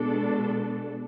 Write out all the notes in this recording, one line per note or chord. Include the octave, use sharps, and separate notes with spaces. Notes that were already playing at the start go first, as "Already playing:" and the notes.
Already playing: B2 G#3 D4 A4